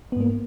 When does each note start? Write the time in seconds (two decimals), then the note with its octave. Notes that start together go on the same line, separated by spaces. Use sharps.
0.12 B3
0.16 G#2
0.20 A#3